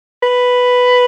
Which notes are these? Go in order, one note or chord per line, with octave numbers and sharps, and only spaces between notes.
B4